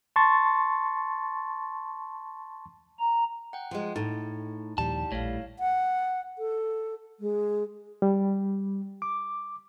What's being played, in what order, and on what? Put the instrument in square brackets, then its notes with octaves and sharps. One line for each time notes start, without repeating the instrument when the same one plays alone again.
[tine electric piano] A5 C6 C#6 A6
[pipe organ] A#5
[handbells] F#5 G5
[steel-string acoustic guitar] F3 G#3
[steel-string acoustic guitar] A2 [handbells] D#4
[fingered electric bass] D#2 A#2 F3 [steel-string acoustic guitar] G3 [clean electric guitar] A5
[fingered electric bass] A#1 [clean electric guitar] A2 [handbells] C#5 F5
[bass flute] F#5
A4
G#3
[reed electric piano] G3
D6